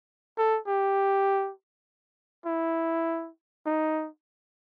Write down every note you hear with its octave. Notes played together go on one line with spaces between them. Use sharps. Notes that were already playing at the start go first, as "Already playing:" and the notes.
A4
G4
E4
D#4